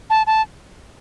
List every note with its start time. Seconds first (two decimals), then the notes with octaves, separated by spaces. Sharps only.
0.10 A5
0.27 A5